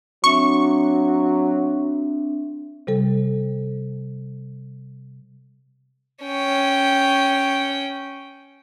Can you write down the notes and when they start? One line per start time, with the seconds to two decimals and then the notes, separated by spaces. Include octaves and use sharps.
0.24 F#3 C4 D4 E5 C#6
2.87 C3 G3 A4
6.23 C#4 G5